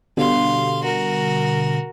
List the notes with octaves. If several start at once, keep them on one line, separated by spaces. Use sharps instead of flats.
B2 D3 G3 F5 C6
F#4 A#4